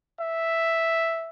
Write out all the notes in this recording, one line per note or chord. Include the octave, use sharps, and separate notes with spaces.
E5